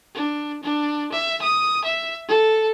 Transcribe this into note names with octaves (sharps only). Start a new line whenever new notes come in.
D4
D4
E5
D#6
E5
A4